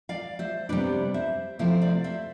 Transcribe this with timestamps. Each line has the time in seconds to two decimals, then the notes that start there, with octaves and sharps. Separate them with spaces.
0.09 D5 F5
0.39 C5 E5
0.69 C3 G3 B3 D4 B4 D5
1.14 C5 E5
1.59 C3 F3 A3 C4 E4 C5 E5
1.82 D5 F5
2.04 C5 E5